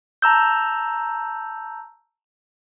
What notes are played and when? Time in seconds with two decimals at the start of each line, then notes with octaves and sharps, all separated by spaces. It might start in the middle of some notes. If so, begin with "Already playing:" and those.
0.22 A5 A#5 E6 G6